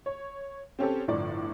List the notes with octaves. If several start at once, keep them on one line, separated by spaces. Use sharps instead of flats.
C#5
C4 C#4 G4 A4
G1 A2 F3 D5